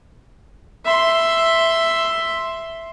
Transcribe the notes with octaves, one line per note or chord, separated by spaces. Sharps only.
E5 C6